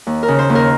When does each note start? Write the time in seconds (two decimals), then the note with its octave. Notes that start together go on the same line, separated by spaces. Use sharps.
0.07 D#2
0.23 A#4
0.28 C#3
0.39 C5
0.50 D#2
0.55 A#4